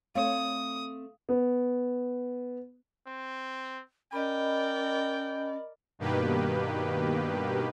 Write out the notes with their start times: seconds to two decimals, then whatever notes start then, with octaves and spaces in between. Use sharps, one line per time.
0.15 A3 C4 C#5 F5 D#6
1.29 B3
3.07 C4
4.13 C#4 A#4 D5 D#5 G5 B5
5.99 G2 B2 D#3 A#3 G4 B4